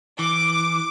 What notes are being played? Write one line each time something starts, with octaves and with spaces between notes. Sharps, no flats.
E3 D6